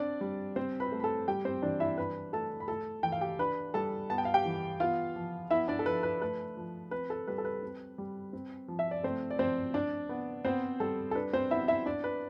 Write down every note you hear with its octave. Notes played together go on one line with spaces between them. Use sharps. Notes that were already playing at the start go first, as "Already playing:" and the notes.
Already playing: C4 D4 D5
G3
C4 C5
B4 B5
A3
B5
A4 A5
G3 G4 G5
C4 C5
E3 D4 D5
E4 E5
D4 B4 B5
A3 A4 A5
B5
A3 A4 A5
E3 G5
F5
G4 G5
D4 B4 B5
G3 A4 A5
B3 A5
G5
F5
G4 G5
E3
B3 F4 F5
F3
B3 E4 E5
D4 D5
A4
F3 B4
B4
A3 B4
F3
C4 B4
A4
G3 B4
A4
B4
C4
G3
C4
F3
E5
D5
A3 C4 C5
D5
F3 C4 C5
D4 D5
B3
B3 C4 C5
G3 A4
A4
D4 B4
C4 C5
B3 E4 E5
E4 E5
D4 D5
B4